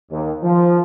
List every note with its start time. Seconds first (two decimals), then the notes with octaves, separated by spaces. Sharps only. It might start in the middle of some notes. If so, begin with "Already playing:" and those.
0.11 D#2
0.43 F3